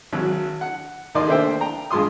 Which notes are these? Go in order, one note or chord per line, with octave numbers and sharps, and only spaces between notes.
G#1 F#3
F#5
D#2 A#3 D#4 D5 C6
A3 A#3 D4 C5 E5 G5
G5 A#5
G2 G#3 F4 C6 D#6